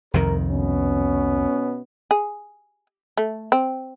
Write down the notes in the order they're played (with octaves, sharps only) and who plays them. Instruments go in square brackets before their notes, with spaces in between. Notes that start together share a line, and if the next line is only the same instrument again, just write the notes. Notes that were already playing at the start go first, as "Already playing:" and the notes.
[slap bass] C2 F2 D#3 [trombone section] A#4
[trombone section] B2 B3 C#4
[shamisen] G#4
A3
C4